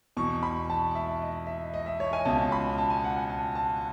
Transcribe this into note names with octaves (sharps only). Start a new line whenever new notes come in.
E2 B2 C#6
B5
A5
E5
E5
D#5
E5
D#5
E5
C#5
G#5
C#2 B2 A5
B5
A5
G#5
F#5
G#5
A5
A5